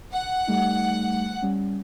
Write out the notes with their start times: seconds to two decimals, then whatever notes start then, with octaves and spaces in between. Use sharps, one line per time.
0.11 F#5
0.47 G3 A3 D#4
1.42 G3 C#4